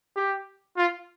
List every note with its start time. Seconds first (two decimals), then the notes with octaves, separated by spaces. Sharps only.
0.16 G4
0.77 F4